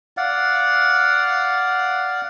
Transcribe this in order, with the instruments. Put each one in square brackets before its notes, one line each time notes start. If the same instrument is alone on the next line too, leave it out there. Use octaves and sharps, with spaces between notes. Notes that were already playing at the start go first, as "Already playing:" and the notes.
[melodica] D5 F5 F#5